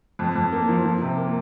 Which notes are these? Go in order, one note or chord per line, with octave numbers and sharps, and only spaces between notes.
F2
F2
A#3
F3
F3
C3
A#3